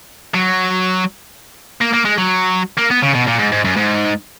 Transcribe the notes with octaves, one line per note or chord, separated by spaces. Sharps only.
F#3
A#3
A#3
G#3
F#3
A#3
B3
C#3
B2
A#2
G#2
G#2
F#2
G#2